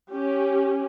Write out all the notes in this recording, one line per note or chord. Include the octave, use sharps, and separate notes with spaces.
C#4 G4